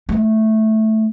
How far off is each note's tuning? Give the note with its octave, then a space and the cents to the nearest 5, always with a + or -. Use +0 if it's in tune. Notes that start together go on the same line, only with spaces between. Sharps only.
A3 -5